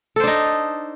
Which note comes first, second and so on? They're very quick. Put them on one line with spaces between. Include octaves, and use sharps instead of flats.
A4 C5 D4 D#4